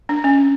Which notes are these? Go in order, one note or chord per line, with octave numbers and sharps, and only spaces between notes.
D4
C#4